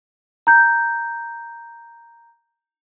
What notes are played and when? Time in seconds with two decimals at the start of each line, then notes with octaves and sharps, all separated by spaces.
0.47 A#5 G6